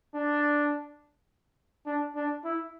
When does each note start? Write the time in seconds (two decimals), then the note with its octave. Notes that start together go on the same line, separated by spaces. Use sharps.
0.15 D4
1.86 D4
2.15 D4
2.44 E4